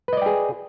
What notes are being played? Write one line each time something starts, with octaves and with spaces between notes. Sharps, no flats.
G#4 B4 D5 D#5 G5